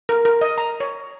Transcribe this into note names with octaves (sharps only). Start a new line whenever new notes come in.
A#4
A#4
D#5
A#5
C#5